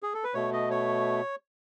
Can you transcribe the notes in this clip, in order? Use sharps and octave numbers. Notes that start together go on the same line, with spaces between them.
G#4
A4
B4
B2 A3 C#5
D#5
C#5